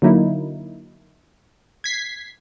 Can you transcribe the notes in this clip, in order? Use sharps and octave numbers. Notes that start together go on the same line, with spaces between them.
D3 F#3 A#3 D#4 E4
G#6 B6 C7